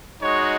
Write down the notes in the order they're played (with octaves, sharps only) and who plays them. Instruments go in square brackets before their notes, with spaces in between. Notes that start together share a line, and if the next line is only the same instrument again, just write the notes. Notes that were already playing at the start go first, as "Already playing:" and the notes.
[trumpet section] G#3 D#4 F#4 C#5